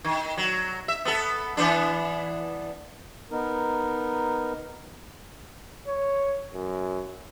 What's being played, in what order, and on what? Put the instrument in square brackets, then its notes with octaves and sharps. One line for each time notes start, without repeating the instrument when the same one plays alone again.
[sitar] D#3
F#3
E5
B3 A4
E3 B3 D4
[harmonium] B3 D#4 A#4
[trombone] C#5
F#2